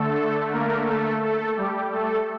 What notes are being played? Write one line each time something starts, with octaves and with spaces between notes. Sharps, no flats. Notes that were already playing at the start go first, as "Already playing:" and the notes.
Already playing: D3 A3 A4
A#3 A#4
A3 A4
A3 A4
G3 G4
A3 A4